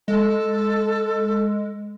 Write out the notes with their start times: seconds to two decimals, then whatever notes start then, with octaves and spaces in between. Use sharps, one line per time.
0.08 G#3 A4